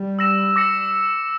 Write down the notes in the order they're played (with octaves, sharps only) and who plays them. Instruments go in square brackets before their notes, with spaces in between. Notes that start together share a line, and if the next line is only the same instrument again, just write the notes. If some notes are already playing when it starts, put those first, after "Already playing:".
Already playing: [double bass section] G3
[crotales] E6 A#6 E7
D6 A#6 C#7